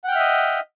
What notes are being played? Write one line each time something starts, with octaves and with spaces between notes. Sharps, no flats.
D#5 E5 F#5 G5 F6